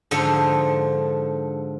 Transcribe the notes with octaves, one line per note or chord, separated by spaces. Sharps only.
G#2 D3 F3 A4 C5